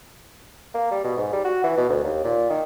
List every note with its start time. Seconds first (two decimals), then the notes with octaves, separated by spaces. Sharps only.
0.74 A#3
0.91 G3
1.04 B2
1.17 G#2
1.33 G3
1.44 F#4
1.64 E3
1.77 B2
1.89 D2
2.03 D#2
2.24 A#2
2.50 D#3